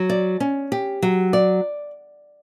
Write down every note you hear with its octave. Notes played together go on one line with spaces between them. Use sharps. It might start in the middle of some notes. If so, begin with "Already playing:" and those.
Already playing: F#3
D5
C#4
G4
F#3
D5